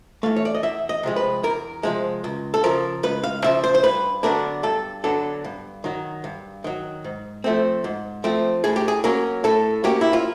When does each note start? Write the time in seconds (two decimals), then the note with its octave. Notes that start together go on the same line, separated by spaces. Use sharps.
0.23 E3 A3 F5
0.36 C#5
0.45 D5
0.55 D#5
0.63 E2 E5
0.89 D#5
1.03 C3 F3 G#3
1.16 B4
1.43 E2 A#4
1.83 C3 F3 G#3
2.24 C#2
2.54 A4
2.64 C#3 F3 A#4
3.03 C#2 B4
3.23 F5
3.44 C#3 F3 E5
3.64 C5
3.75 C5
3.83 G2 B4
4.23 D3 F#3 B3 D4 A#4
4.63 G2 A4
5.04 D3 F#3 B3 D4 A4
5.44 G2
5.84 D#3 F#3
6.24 G2
6.64 D#3 F#3
7.04 G#2
7.44 F3 A3 C4
7.84 G#2
8.24 F3 A3 C4
8.64 A2 G#4
8.76 G4
8.88 G#4
9.04 F#3 A#3 C#4 A#4
9.44 A2 A4
9.84 F#3 A#3 C#4 G4
10.01 E4
10.13 F4